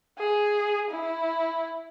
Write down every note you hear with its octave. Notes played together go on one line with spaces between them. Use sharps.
G#4
E4